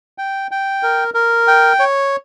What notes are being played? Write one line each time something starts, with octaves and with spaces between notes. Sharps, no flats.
G5
G5
A#4
A#4
G5
C#5